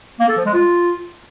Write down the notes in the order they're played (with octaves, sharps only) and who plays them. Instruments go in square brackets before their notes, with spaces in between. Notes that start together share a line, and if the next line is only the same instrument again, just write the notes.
[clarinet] A#3
A4
F3
G#3
F4